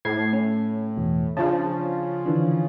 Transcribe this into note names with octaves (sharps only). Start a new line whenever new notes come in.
A2 G#6 C7
C#4
E2 B2
C#3 F3 D4 F4 A5
D3 E3 D4